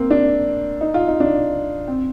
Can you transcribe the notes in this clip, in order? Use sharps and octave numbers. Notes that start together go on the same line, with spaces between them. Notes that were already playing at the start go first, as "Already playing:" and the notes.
Already playing: A#3 C4
D4
D#4
F4
D#4
D4
C4